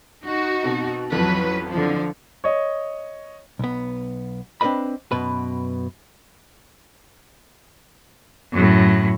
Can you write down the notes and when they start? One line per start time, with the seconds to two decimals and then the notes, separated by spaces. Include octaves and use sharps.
0.24 D#4 F#4
0.63 B2 C4
1.12 A1 F2 F#3 B4 A5
1.70 D3 F3
2.44 C#5 D#5
3.59 B1 B3
4.61 C4 D4 A#4 B4 D#5 B5
5.12 F#2 B2 B4
8.53 F#2 A2